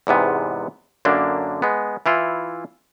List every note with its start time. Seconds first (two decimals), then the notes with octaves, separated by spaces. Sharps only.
0.07 E2 G#2 C3 B3
1.05 F#2 D3 A#3 D4
1.62 G#3 B3
2.06 E3 E4 F4